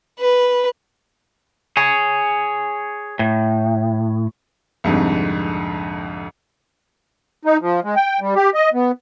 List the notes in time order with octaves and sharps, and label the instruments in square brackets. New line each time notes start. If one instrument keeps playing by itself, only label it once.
[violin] B4
[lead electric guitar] G#4 C#5
A2
[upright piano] C2 F2 G#2 D3
[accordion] D#4
F3
G#3
G5
G3
G4
D#5
B3